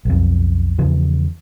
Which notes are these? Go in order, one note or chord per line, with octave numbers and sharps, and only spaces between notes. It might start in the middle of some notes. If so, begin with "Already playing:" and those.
B1 F2
E2 C#3 F3